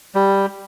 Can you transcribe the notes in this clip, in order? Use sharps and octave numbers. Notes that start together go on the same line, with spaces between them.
G3